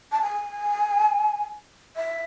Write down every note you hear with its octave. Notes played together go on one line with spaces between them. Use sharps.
A5
G#5
E5